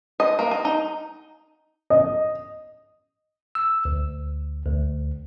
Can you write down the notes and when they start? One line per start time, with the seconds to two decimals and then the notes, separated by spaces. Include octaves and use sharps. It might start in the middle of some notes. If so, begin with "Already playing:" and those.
0.20 D#5
0.39 A#3
0.51 D#5
0.65 D#4
1.90 D#5
3.55 E6
3.85 D2
4.66 D2